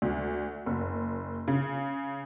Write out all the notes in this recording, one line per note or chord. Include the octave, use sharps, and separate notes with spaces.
D2
F#1
C#3